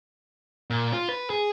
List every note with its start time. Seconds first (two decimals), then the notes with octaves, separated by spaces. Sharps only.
0.70 A#2
0.93 F4
1.09 B4
1.30 G#4